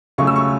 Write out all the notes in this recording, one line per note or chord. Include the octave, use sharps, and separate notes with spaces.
C#2 C#3 F#3 A3 C#6
E6
C#6